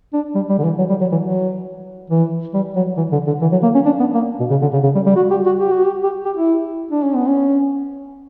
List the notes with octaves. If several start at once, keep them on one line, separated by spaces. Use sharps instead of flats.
D4
G3
G3
D3
E3
F#3
G3
F#3
E3
F#3
E3
G3
F#3
E3
D3
D3
E3
F#3
A#3
C#4
D4
B3
A#3
B2
C#3
D3
C#3
C#3
G3
G3
F#4
G4
F#4
G4
F#4
G4
G4
G4
E4
D4
C#4
B3
C#4